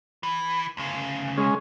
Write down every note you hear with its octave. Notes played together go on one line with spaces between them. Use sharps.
E3
D2 C#3
G#3 C#4